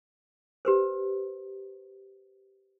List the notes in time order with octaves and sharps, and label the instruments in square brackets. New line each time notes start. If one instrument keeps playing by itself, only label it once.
[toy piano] G4 B4 C5